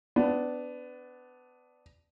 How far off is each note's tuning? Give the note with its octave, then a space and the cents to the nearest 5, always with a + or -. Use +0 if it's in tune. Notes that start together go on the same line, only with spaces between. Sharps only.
B3 +25 D4 +0